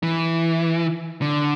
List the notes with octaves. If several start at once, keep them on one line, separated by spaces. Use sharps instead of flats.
E3
D3